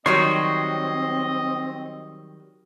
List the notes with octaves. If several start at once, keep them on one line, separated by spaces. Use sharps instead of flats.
D#3 F#3 G3 C4 C#5 D#5 C6 C#6